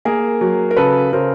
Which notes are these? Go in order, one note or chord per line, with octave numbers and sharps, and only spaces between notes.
A#3 G#4 A#4
F#3
A#4
C#3 A4 B4
C#3 A#4 C5